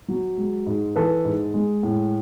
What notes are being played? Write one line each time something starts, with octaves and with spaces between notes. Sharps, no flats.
F#3
G#3
G#2
E3 A4 B4
G#2
G#3
A2